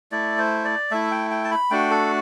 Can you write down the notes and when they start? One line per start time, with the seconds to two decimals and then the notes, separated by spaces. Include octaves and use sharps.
0.12 A3 E4 D5
0.38 C5
0.65 D5
0.91 A3 E4 E5
1.11 G5
1.31 G5
1.44 A5
1.51 B5
1.71 A3 D4 F#4 G5
1.91 A4